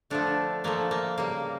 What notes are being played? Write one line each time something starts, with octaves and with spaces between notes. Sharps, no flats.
D3 F3 A3 D4
D3 F3 A3 A#3
A#3
C#3 G3 A#3